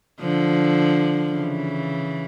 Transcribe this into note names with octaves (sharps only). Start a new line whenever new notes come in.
D3 F3
C#3 E3